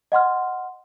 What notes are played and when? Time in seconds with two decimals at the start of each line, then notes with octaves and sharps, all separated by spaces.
0.12 D#5 F#5 C6 F6